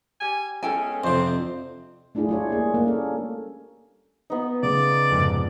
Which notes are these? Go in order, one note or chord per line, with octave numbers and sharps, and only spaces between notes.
G3 G4 G#5
G#3 B3 C#4 A4 G5 G#5
F2 C3 C4 D4 C5
A3 D4 E4 F4 G#4
G3 F4 C#5
A#3 G#4
A#3
C#4 A4
B3 D#4
C#3 D5
F2 G#2 C3